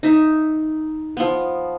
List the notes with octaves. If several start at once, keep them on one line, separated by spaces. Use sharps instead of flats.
D#4 E5
F3 B3